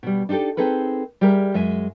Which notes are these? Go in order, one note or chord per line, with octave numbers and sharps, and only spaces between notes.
B2 G3
D4 D#4 F4 G4 A4
C4 D#4 G#4 A4 B4
G3 G4 G#4 A#4 E5
F#2 G#3 E5 G#5